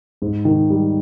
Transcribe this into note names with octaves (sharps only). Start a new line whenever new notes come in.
G#2
D#3
G3